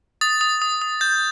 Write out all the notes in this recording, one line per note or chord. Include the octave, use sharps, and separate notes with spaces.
D#6 A6
D#6
D#6
D#6
G6 A6